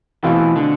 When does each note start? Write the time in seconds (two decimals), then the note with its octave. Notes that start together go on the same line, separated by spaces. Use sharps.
0.23 B2 E3 A3 C4 F4 A4
0.56 D3